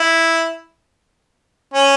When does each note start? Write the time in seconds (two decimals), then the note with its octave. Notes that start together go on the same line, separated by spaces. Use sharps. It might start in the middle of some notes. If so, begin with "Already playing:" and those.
Already playing: E4
1.74 C#4